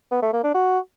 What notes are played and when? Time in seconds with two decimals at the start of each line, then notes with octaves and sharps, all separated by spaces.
0.12 B3
0.22 A3
0.33 A#3
0.44 D4
0.55 F#4